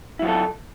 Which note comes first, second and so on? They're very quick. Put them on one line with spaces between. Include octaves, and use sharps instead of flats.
E4 F#3 F4 A4